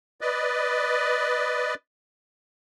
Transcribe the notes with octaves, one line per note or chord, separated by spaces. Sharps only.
B4 D5 D#5